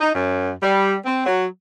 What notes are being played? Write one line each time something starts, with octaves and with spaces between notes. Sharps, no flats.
D#4
F#2
G3
C4
F#3